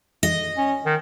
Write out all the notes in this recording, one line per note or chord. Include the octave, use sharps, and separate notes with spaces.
D#5
C#4
D#3